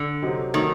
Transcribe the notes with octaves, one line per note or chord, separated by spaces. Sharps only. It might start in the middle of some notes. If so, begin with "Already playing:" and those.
Already playing: D3
C3 F#3 C4 D#4
D#3 F#3 A3 D#4